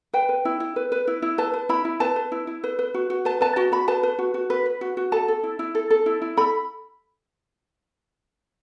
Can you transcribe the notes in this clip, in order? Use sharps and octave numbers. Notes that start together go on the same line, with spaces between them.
B4 G5
B4
E4
E4
B4
B4
E4
E4
B4 A5
B4
E4 B5
E4
B4 A5
B4
E4
E4
B4
B4
F#4
F#4
B4 A5
B4 A5
F#4 A5
F#4 B5
B4 A5
B4
F#4
F#4
B4
B4
F#4
F#4
A4 A5
A4
E4
E4
A4
A4
E4
E4
A4 B5